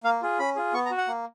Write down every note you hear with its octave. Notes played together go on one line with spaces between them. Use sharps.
A#3 F5
F4 G#4
C#4 B5
F4 G#4
B3 C#6
A#5
F#4
F#5
A#3